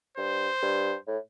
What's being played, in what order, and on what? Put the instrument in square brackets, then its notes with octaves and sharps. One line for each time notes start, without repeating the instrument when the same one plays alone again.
[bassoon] G2 [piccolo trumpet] C5
[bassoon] G2
A2